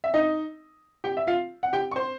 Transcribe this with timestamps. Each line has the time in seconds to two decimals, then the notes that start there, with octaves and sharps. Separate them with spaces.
0.04 E5
0.14 D#4 D#5
1.04 G4 G5
1.17 E5
1.27 F4 F5
1.63 F#5
1.73 G4 G5
1.91 C#6
1.96 C5 C6